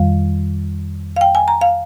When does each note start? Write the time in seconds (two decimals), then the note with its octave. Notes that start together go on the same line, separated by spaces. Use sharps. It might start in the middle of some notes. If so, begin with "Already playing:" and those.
Already playing: F2 D#3 G3 F5
1.16 F5
1.21 G5
1.35 G#5
1.48 A#5
1.61 F5